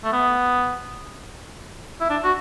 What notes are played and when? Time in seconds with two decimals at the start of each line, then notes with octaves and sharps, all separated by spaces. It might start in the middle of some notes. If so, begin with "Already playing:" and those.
0.04 A3
0.12 B3
2.00 E4
2.10 D4
2.24 F#4